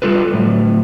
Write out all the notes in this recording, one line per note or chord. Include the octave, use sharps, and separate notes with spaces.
G3 F4 A4 B4
A2 F#3